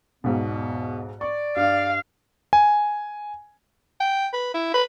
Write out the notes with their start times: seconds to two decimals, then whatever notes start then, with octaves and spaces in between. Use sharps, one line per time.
0.24 B1 E2 G#2 B2 B3
1.21 D5 C#6
1.56 G2 F5
2.53 G#5
4.00 G5
4.33 B4
4.54 E4
4.74 B4